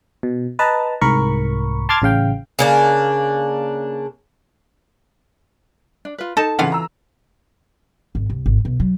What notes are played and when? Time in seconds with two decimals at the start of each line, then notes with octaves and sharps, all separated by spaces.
0.23 B2
0.59 B4 D#5 A5 A#5
1.01 C2 G#2 A#4 B5 C#6
1.89 A5 C6 D6 F6 G#6 A6
2.02 A1 C#3 F5 G5
2.59 C#3 A#3 D4
6.05 D4
6.18 F4 B4
6.37 D#4 A4 A5
6.59 C#3 E3 F4 F5 F#5
6.72 A#5 E6
8.15 G#1
8.30 C2
8.46 G#1
8.65 B1
8.80 F#3